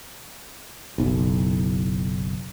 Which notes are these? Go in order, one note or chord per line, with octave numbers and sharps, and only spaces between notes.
F#1 B1